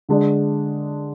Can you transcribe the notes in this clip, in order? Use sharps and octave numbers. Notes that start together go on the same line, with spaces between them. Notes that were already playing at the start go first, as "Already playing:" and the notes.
D3 G#3 D4